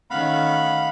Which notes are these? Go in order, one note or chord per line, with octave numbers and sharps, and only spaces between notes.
D#3 A3 C#4 F5 F#5 B5